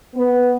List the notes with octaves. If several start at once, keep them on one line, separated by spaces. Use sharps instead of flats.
B3